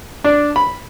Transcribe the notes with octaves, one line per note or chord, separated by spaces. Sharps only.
D4
B5